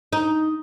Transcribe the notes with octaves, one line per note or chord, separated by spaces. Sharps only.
D#4